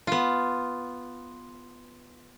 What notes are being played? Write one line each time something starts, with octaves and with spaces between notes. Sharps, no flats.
B3 F4